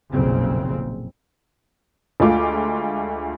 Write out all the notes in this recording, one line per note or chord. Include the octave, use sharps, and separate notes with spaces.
F#1 B1 F2 A#2 C#3 C4
D2 G#3 A3 F4 D6